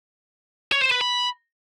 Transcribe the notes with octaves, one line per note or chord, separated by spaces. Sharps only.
C#5
C5
B4
B5